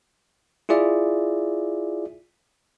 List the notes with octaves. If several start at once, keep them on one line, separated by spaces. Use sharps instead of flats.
E4 F4 G#4 D5 E5